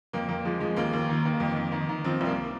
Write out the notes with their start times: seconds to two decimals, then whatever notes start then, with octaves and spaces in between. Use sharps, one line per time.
0.13 F2 A#3
0.29 F2 A#3
0.45 F3 G#3
0.60 F3 G#3
0.76 D#2 A#3
0.93 D#2
1.09 D#3
1.25 D#3
1.40 F2
1.56 F2
1.72 D#3
1.89 D#3
2.04 F3 C4
2.21 C2 A#3